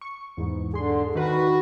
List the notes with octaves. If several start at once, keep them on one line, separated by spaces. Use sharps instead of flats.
C#6
E2 G#2
D3 G#4 C6
D#3 F#4 B4